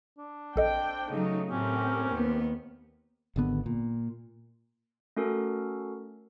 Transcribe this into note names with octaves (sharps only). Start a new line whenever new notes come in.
D4
A#1 C4 A4 D#5 G5
C#3 F#3 A3 D#4
A2 C4 C#4 G4 A#4
D#2 B3
G#1 D3 B3
A#2
A3 C#4 F#4 A4 A#4